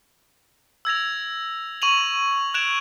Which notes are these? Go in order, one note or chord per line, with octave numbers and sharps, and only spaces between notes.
E6 G#6 A#6 F7
C#6 D#7 F7 F#7
F#6 G#6 D7 E7 F7